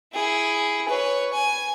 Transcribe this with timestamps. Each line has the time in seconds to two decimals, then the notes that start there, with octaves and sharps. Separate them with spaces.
0.13 E4 G#4
0.88 B4 C#5
1.33 G#5